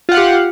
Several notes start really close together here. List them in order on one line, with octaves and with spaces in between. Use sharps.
F4 F#5 F5 G4